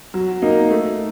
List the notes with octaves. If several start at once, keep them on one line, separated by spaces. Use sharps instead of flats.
F#3
A#3 D#4
A3